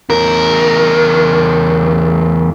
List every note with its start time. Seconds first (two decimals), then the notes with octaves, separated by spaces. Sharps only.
0.10 E2 A#4